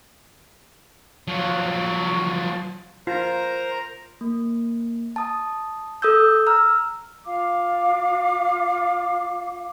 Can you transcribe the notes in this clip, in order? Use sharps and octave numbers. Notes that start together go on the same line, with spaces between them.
F3 F#3
F4 A#4 C5 A#5
A#3
A5 D#6
A4 D#6 E6 G6
A#5 E6 F6
F4 F5 D6